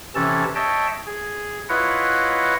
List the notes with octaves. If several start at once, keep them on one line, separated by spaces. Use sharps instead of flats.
C3 E3 C#4 A4 A5
C#5 D#5 E5 G5 A5
G#4
E4 F4 B4 C#5 D#5 F#5